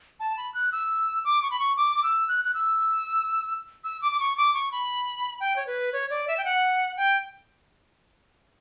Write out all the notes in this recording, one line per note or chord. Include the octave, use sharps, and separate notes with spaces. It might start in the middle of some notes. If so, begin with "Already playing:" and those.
A5
B5
F#6
E6
D6
C#6
B5
C#6
D6
D6
E6
F#6
F#6
E6
E6
D6
D6
C#6
D6
C#6
B5
G5
C#5
B4
C#5
D5
E5
G5
F#5
G5